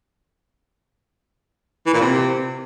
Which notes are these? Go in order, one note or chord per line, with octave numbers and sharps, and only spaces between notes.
E3
A#2
C3